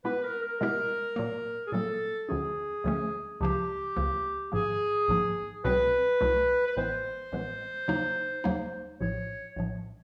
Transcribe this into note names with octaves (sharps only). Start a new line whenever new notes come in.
B2 G#3 B3 E4 G4 B4
A#4
A#4
B2 G#3 B3 E4 G4 A#4
A#2 F#3 A#3
G#4
A#2 F#3 A#3 A4
D2 D3 F3 A3 C#4 G#4
D2 D3 F3 A3 C#4
C#2 C#3 F3 A#3 G4
C#2 C#3 F3 A#3
G#1 G#2 F3 A#3 G#4
G#1 G#2 F3 A#3
C2 B2 F#3 A3 C4 B4
C2 B2 F#3 A3 C4
B4
A1 A2 E3 G#3 B3 C5
A1 A2 E3 G#3 B3
D#2 C#3 F#3 A#3 D#4
D#2 C#3 F#3 A#3 D#4
A#1 A2 F3 C#5
A#1 A2 F3